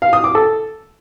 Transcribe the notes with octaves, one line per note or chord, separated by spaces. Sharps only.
F5
D#6
D6
A4